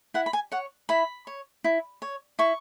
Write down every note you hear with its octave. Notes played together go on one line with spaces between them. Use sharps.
E4 F#5
B5
G#5
C#5 F#5
E4 B5
C#5
E4
C#5
E4 C#6